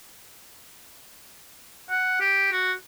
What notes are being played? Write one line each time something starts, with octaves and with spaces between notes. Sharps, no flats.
F#5
G4
F#4